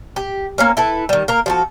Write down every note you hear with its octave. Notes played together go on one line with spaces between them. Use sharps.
G4
A#3 C4 C#4
E4 A4 B4
D#3 G3
A#3 A#4
F3 F#4 A4